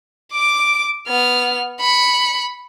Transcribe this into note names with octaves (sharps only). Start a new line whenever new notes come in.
D6 D7
B3 F6
B5 C#7